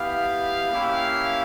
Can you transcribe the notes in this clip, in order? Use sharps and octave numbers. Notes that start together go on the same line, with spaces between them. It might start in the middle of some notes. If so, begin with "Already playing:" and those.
Already playing: B3 E4 G4 F5
A#3 C#4 E4 G4